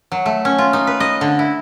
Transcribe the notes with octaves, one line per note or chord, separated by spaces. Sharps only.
F#3
A3
C#4
F4
D#4
B4
D#5
D3
E4